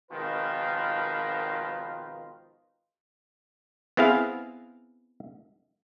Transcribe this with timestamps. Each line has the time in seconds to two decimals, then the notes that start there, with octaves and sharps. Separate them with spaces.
0.11 G#1 B2 D#3 F3 F4 B4
3.97 B3 C4 E4 G#4 F5